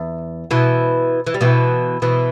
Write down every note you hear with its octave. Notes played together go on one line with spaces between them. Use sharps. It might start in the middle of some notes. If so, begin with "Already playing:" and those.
Already playing: E2
B2 E3
E3
G3
B2 E3
B2 E3